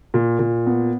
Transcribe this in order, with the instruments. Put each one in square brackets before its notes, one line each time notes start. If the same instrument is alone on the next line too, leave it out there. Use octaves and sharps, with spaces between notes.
[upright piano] A#2
A#2
B3